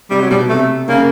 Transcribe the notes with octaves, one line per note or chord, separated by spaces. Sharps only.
C3 G3
F#3
B2 G3
C3 A3
C#3 A#3